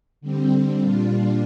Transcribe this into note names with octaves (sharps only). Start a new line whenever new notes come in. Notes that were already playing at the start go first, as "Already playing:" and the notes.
D3 G3 C4
A#2 G3 D4 F4